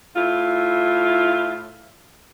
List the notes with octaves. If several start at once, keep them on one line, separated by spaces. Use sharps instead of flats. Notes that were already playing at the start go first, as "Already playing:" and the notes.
A2 E4 F4